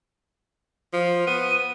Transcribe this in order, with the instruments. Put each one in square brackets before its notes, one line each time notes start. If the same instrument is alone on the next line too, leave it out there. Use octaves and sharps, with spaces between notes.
[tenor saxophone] F3
[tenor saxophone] B3 [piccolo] D#7